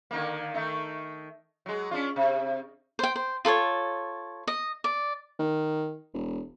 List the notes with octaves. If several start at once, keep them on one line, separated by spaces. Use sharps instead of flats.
D3 D#3 A#3
D#3 A3 D#4
F#3 G#3
C#4 D4 F4
C3
C5 G5
C5
F4 A4 C5 C#5
D#5
D5
D#3
E1